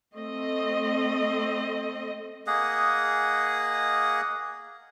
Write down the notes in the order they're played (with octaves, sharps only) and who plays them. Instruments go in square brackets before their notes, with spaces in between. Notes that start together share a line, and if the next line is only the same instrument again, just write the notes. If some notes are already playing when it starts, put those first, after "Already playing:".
[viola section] A3 C4 D#5
[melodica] A#3 G#4 D#5 F#5